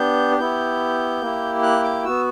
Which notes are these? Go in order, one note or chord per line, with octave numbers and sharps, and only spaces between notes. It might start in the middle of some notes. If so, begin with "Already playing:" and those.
Already playing: B3 D4 G4 G6
B3 E4 G4 G6
A#3 E4 G4
F#6
D6
B3 F#4 E6